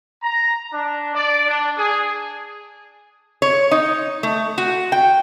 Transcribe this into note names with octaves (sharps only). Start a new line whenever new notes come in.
A#5
D4
D5
D4
G#4
C#5
D#4
A3
F#4
G5